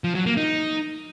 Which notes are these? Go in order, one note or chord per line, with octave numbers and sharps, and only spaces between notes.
F3
F#3
A#3
D#4